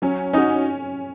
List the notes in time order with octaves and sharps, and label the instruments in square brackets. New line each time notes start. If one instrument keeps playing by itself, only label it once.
[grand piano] F#3 [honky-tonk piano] C#4
[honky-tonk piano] C#4 [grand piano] D#4 F#4